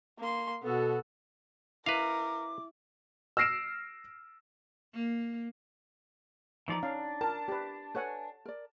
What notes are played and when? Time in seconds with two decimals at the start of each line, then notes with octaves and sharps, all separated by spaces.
0.19 A#3 C6
0.63 B2 B3 F#4 A4
1.86 E4 A#4 B4 D#5 F5 D6
3.37 E6 F6 A#6 C7 D7 E7
4.93 A#3
6.68 E3 F3 D#4 D5 A#5
6.83 C#4 D4 F5
7.21 A#4 A5
7.48 G4 B4 D5
7.95 A4 B4 C#5 F#5 G#5
8.45 A#4 D5